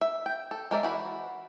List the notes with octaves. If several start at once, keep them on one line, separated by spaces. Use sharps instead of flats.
E5
G5
A4
G#3 A#4 D5 E5
E3 F#4 B5